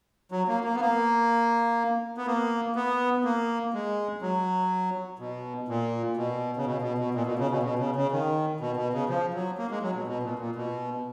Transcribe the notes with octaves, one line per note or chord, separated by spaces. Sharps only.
F#3
A#3
A#3
B3
A#3
B3
A#3
B3
A#3
G#3
F#3
B2
A#2
B2
C#3
B2
B2
B2
A#2
B2
C#3
B2
B2
C#3
C#3
D#3
B2
B2
C#3
F3
F#3
A#3
G#3
F#3
B2
B2
A#2
A#2
B2